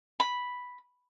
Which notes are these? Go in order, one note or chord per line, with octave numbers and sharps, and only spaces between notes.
B5